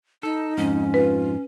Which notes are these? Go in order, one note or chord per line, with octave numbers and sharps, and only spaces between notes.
D#4 A4
F2 G#2 C#4
F4 B4